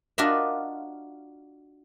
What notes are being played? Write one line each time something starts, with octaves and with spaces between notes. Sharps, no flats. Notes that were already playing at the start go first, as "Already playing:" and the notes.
D4 F4 F#4 A#4 D#5 E5